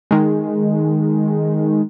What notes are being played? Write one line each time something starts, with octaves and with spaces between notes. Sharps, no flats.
D#3 G#3